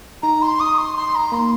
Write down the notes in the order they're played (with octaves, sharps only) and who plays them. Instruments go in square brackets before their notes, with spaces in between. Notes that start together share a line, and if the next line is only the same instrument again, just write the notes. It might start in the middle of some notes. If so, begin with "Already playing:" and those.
[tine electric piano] D#4 [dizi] A#5
[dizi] C6
D#6
C6
C6
A#5
[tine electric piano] A#3 [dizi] C6